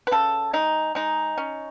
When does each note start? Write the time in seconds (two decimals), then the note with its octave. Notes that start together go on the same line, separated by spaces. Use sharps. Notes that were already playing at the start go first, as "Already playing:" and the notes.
0.07 B4
0.11 C#3 A4
0.53 G#3 D#4
0.95 G#3 D#4
1.37 C#4